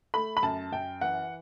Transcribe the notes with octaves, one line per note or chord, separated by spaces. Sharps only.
A3 B5
B5
F#2 A5
F#2 G5
E3 F#5